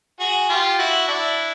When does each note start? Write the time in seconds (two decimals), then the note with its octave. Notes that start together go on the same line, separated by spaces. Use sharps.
0.19 F#4 G#4
0.49 F4 G4
0.78 E4 F#4
1.08 D4 E4